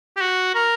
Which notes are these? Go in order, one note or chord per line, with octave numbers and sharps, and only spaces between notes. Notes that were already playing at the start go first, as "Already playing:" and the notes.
G4
F#4
A#4